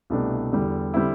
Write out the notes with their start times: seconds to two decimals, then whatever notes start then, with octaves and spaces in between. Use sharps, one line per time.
0.10 C2 B2 A3 D4 G4
0.52 E2 D3 G3
0.94 D3 G3 C4 E4